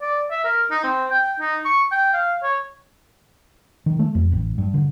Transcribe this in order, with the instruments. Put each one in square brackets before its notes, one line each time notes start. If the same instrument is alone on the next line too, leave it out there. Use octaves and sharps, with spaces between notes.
[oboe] D5
E5
A#4
D#4
C4
G5
D#4
C#6
G5
F5
C#5
[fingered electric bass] D#3
A3
F2
A1
G2
D3